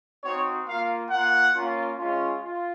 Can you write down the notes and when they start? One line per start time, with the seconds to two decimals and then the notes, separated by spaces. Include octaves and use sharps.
0.24 C4 D#4 F#4 C#5
0.67 A#3 F4 F5
1.10 A#3 F4 F#5
1.54 A#3 C#4 F4
1.98 G#3 C#4 F4
2.42 F4